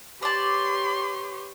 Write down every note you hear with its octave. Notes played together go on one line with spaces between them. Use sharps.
G4 B4 C#5 D5 A5 C6